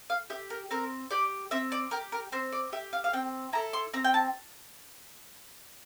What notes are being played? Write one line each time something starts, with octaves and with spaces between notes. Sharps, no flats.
F5
G4 E5
A#4
C4 A#4
G4 D5
C4 E5
D5
G4 A#4
A#4
C4 C5
D5
G4 E5
F5
F5
C4 G5
E4 A4 A#5
C6
C4 A#5
G5
A5